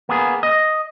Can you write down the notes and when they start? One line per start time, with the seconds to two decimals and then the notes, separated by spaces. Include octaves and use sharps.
0.09 A#3 B3 G#4
0.43 D#5